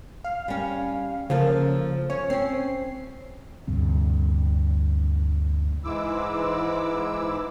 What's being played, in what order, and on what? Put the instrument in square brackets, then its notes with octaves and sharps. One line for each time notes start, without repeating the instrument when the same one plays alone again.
[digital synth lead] F5
[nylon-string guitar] G3 C#4
[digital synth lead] C#3 [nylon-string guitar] F3 A#3 A4
[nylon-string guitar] C#4 [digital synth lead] C#5
[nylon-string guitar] C4 C#4 [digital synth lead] C7
[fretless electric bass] D2 G2 C3
[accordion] G#2 E3 G#3 E4 D6 E6